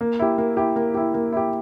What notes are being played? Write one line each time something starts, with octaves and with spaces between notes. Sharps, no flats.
A#3
E4 G4
A#3
E4 G4
A#3
E4 G4
A#3
E4 G4